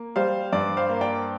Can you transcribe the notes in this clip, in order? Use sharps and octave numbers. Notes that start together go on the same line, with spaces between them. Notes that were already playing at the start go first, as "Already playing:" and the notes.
Already playing: A#3
G3 C5 F5
G2 D5
C5 F5
A#3
D5 G5